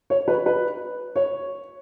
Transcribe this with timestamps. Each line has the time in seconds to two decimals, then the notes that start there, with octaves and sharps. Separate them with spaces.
0.10 C#5
0.28 B4
0.46 B4
1.16 C#5